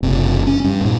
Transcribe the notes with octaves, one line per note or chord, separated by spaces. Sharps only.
F#1 C3
C#4
G2
G2 A#2